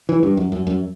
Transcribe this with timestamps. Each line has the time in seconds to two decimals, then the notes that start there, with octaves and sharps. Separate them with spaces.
0.09 E3
0.23 G2
0.37 F#2
0.52 F#2
0.67 F#2